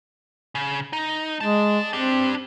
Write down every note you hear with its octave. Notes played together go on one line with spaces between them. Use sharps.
C#3
D#4
G#3 D5 A5
C4 D4 G4